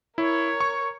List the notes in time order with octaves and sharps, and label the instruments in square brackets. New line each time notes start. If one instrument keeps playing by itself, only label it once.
[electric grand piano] E4 [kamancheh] A#4 C#5
[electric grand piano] C#6